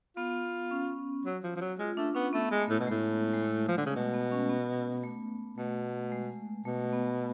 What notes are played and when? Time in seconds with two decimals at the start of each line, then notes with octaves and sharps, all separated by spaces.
0.17 B3 F4
0.71 C#4
1.25 F#3
1.43 F3
1.56 F3
1.61 F#3
1.79 G#3 F4
1.97 A3 D4
2.15 B3 C#4
2.33 A3 B3
2.51 G#3
2.60 A3
2.69 A2
2.80 B2
2.87 A2 G#3
3.34 G#3
3.41 A3
3.68 F3
3.78 D3
3.86 C#3
3.95 B2 A3
4.14 B3
4.32 C#4
4.49 B3
5.04 A3
5.57 B2 A3
6.12 G#3
6.65 B2 A3
6.93 B3